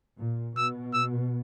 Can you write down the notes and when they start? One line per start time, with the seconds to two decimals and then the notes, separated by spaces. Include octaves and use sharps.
0.19 A#2
0.56 B2 E6
0.93 E6